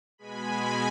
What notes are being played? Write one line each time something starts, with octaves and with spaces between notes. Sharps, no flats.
B2 G#3 G#5 B5